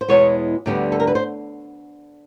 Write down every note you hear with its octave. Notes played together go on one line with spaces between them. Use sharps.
C5
E2 B2 G#3 B3 C#5
D2 D3 G3 B3 D5
A4
A#4
B4
C5